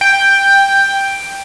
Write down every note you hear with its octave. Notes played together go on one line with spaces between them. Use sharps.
G5